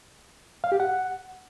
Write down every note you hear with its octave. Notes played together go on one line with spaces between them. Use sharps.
F5
G4
F#5